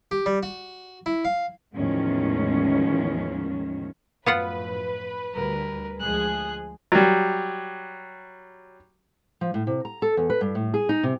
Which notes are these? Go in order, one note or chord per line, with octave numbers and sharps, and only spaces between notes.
G4
G3
F#4
E4
F5
E2 A2 D#3 F3 G#3 C#4
F#2 A2 F3 B3 F4 B4 F#5
D2 D3 G3 A#4
D2 F3 G#3 G#4 F#6
F#3 G3
F3
A2
C3
A#5
A4
E2
B4
G2
A2
G#4
D#4
C3